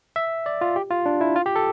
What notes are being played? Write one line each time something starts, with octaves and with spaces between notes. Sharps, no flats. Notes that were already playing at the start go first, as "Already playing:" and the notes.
E5
D5
F4
G4
F4
D4
E4
F4
G4
A4